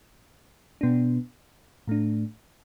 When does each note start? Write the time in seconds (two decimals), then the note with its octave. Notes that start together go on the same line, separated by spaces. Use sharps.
0.81 B2 B3 D4
1.88 A2 A3 D4